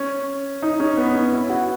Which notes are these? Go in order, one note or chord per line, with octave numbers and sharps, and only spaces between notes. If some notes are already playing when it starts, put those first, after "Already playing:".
Already playing: C#4
D#4
C#4
B3
C#4
E4
F#4